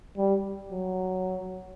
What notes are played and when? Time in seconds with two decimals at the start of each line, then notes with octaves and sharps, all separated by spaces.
0.18 G3
0.72 F#3